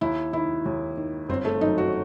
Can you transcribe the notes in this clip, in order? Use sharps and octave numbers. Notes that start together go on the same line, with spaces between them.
D#2 E4
D#3 E4
D#2
D#3
G1 C4
A3
F#2 D#3 D#4
F#4